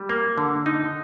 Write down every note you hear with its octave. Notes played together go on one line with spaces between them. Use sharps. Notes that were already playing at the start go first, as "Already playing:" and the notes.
Already playing: G3
A#3
D3
D#4